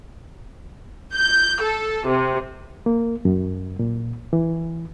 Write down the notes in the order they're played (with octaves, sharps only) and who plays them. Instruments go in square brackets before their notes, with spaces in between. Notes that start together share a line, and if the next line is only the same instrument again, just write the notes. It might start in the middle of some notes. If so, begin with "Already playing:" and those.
[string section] G6
A4
C3
[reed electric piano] A#3
F#2
A#2
E3